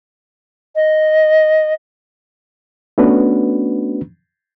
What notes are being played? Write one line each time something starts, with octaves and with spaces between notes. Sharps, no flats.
D#5
A3 B3 C#4 D4 F#4 B4